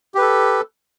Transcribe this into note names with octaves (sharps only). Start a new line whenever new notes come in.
G4 A4 B4